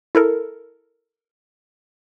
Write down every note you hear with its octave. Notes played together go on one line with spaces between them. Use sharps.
E4 A4 A#4